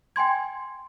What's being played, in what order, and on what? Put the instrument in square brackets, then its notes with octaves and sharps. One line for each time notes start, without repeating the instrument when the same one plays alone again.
[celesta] G5 G#5 C6 G#6